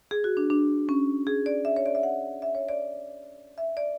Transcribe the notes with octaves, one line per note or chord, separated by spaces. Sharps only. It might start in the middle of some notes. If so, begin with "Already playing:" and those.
G#4
F#4
D4
D4
C#4
G#4
D5
E5
C#5
D5
E5
F#5
E5
C#5
D5
E5
D5